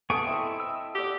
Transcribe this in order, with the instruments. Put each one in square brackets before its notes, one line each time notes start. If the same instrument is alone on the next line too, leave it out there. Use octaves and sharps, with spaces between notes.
[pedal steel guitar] B3 G#4 C#6 [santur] A4 F5 A5 [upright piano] D#6 D7
[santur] C4 D#5 E5 [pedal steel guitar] E4
[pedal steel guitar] E6
[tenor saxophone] G4 [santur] D5 F#5